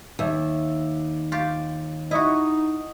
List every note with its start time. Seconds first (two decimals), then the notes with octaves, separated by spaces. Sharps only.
0.19 D#2 E5
1.32 F4 G4 A6
2.11 D#4 E4 F#4 D#5 C#6